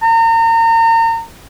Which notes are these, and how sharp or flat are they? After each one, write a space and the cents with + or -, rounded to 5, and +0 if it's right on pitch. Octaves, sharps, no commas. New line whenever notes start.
A#5 -35